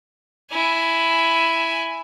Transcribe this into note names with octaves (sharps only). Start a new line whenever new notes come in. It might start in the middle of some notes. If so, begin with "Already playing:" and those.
E4 G#5